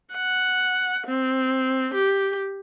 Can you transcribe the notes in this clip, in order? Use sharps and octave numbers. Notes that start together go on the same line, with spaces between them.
F#5
C4
G4